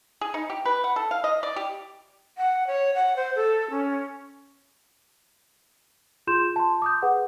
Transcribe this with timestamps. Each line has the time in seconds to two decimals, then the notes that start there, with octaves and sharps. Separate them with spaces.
0.21 G#4
0.34 D#4
0.50 G4
0.66 B4
0.84 F#5
0.96 A4
1.11 F5
1.24 D#5
1.43 D5
1.56 G4
2.38 F#5
2.67 C#5
2.95 F#5
3.16 C5
3.36 A4
3.71 C#4
6.27 F4 G#4 C6 G6 E7
6.56 A5 C6
6.82 D6 D#6 G6
7.02 G#4 B4 F#5